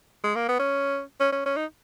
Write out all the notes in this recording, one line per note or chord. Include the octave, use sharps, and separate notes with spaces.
G#3
A#3
B3
C#4
C#4
C#4
C#4
D#4